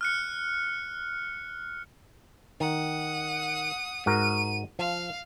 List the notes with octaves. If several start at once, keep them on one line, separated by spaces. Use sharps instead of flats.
F6 F#6 C#7
D#3 F#5 D#6
G#2 F#4 A#4 D#7
F3 F5